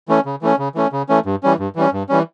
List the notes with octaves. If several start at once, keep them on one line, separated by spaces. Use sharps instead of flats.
E3 A3 C#4
C#3
E3 A3 C#4
C#3
E3 A3 C#4
C#3
E3 A3 C#4
G2
E3 G3 C#4
G2
E3 G3 C#4
G2
E3 G3 C#4